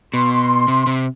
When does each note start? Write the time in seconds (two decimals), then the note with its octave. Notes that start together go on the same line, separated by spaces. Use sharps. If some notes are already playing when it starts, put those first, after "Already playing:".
0.13 B2 C6
0.68 C3
0.87 C3